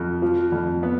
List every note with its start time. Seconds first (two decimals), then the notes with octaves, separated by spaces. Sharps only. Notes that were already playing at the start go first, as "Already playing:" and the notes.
Already playing: F2
0.22 F3
0.52 F2
0.83 B3